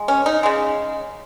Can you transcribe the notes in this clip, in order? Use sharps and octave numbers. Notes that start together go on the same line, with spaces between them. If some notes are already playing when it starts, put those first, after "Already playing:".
Already playing: G#3
C#4
D#4
C#3 G#3